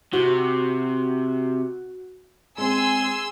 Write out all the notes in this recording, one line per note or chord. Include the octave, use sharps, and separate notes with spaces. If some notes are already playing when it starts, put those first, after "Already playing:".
C3 F#4
G#3 C4 G#4 G#5 C6 E6